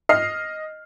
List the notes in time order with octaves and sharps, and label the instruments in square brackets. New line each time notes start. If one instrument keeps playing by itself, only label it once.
[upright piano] D#5 F6 C7